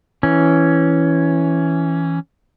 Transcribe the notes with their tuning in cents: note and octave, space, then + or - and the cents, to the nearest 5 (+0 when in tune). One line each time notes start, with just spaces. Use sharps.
E3 +0 C#4 +0